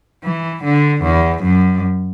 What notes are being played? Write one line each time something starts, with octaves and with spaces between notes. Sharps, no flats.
E3
D3
E2
F#2